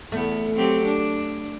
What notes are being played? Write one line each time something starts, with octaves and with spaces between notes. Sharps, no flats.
E2 A3 B3
F#3 C4 G4
D4